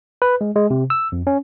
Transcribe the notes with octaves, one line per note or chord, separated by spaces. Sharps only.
B4
G#3
G#3
C3
E6
F2
C#4